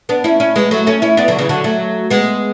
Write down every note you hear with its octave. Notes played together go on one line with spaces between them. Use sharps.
B3 D4
C#4 E4
C#4 E4
G#3 B3
F#3 A3
A3 C#4
C#4 E4
B3 D4
D3 F#3
C#3 E3
D3 F#3
F#3 A3
G#3 B3